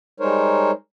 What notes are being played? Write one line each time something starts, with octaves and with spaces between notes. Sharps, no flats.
G3 G#3 D#4 A#4 C5 C#5